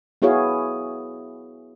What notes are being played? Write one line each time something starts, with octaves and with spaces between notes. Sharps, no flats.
B3 E4 F#4 G#4 C#5 F5